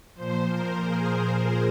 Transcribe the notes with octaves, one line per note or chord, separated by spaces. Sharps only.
A#2 F3 C5
A#4
G#4
A#4